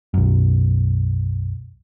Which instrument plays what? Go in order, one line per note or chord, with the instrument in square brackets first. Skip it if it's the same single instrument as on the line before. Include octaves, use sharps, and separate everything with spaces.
[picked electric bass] B1 F#2